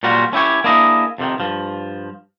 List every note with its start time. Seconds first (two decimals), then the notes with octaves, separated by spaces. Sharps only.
0.03 A#2 F#3 G3 F4 F#4
0.33 C#4 E4 G4 C#5
0.64 A#3 D4 E4 G#4 D#5
1.18 F2 C3 D#3
1.40 G2 F3